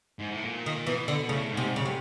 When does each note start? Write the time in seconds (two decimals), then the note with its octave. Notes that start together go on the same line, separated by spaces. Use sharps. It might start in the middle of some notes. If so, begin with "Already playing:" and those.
0.19 G#2
0.32 A2
0.44 A#2
0.66 D#3
0.87 B2 E3
1.08 D3
1.29 A2 C#3
1.51 G#2
1.57 C3
1.76 C#3
1.85 C3